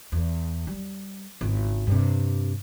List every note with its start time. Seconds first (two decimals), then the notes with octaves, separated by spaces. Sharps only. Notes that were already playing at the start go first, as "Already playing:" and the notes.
0.12 E2
0.67 G3
1.41 G#1 C#2
1.87 G2 C3